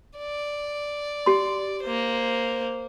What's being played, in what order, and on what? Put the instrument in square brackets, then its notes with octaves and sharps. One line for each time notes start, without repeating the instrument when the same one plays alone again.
[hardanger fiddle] D5
[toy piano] G4 C6
[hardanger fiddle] A#3 C5